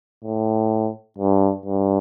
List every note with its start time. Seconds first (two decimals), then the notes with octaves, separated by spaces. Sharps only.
0.24 A2
1.18 G2
1.66 G2